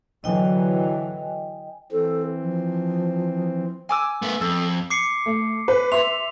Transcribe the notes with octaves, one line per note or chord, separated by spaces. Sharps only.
D3 E3 F#3 D#5 G5 G#5
E3 C4 A4
F3
G#5 D6 E6
A3 B3
F2 A4
D6 C7 C#7
A3
B4
E5 C6 F7